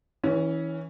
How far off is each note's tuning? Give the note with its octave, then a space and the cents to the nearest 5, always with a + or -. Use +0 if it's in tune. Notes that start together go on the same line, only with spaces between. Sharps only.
E3 -20 C#4 +5